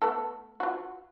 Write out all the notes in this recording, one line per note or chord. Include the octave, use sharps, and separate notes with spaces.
A3 B3 A4
F4 F#4